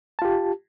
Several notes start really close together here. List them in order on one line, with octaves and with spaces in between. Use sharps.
A5 F4 G4